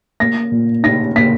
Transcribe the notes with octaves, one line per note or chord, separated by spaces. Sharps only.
A#3 A#6
A#2
D#4 A#6
A#3 B6